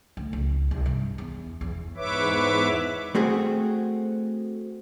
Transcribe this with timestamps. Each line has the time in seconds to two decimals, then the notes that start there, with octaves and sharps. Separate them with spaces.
0.17 D2
0.33 C#2
0.71 C2
0.86 G2
1.18 E2
1.61 E2
1.96 E2 G#2 B4 C#5 E5 D6
3.15 A3 C4 F#4 G#4